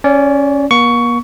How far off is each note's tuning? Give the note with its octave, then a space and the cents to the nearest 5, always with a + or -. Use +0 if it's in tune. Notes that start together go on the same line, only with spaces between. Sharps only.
C#4 +0 D5 -25
A#3 +45 C#6 +15